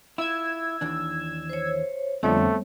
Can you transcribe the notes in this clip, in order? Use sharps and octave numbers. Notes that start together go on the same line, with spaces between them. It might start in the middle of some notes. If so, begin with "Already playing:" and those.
E4 F4 E6 G#6
D#2 E3 D4
C5 C#5
F2 D3 G3 A3 B3 C4 C#5